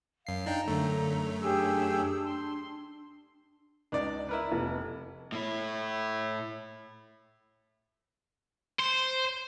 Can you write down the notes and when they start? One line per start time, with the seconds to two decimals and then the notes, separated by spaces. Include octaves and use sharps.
0.27 F#2 F5 C7
0.46 D4 D#4 G5 A#5
0.67 F#2 D3 A3
1.40 D4 G4 G#4 E6
2.24 C6
3.92 C#2 D4 D#4 D5
4.29 E4 A#4 B4
4.52 F1
5.32 A2 E4
8.80 C5